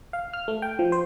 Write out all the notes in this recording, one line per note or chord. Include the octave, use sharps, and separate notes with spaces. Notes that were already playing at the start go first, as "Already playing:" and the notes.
F5
F6
A3
G5
F3
C5